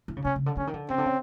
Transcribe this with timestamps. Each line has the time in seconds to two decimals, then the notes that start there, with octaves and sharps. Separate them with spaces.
0.08 E3
0.17 C#3
0.25 C3 C#4
0.36 C#3
0.46 D3
0.57 D3 C#4
0.67 D#3
0.74 D3
0.89 C#3 C4
0.98 D3
1.06 C#3